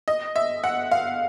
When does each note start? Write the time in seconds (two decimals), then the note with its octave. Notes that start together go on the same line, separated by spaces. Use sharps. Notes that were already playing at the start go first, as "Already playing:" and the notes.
0.08 D#5
0.36 E5
0.64 F#5
0.91 F5